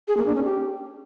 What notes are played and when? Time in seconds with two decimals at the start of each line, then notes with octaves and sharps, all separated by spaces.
0.08 G#4
0.17 A#3
0.26 D4
0.35 C#4
0.44 G4